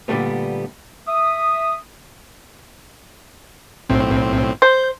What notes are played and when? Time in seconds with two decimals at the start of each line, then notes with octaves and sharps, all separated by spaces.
0.08 A#2 D3 E3 G3 A3 B3
1.08 E5 D#6
3.90 B1 A2 C4
4.62 C5 G6